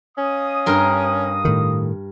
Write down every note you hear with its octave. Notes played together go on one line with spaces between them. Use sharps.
C#4 D#5 F5 D#6
G2 A#4 C6
A2 D#3